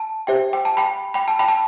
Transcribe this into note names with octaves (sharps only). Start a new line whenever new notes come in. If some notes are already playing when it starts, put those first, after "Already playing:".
Already playing: A5
G4 C5 E5 G5
G5
A5
G5 B5
G5 B5
A5
G5 B5
A5